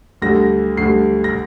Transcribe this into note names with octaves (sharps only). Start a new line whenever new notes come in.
D2 D3 G3 A#6
D2 D3 G3 C7
A#6